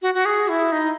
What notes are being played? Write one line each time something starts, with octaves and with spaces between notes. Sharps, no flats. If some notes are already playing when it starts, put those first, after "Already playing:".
F#4
F#4
G#4
E4
D#4